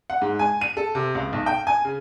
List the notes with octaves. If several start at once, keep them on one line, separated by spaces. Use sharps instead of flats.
F#5
G#2
G#5
D#7
A4
C3
C#2
B1
G5
G#5
C#3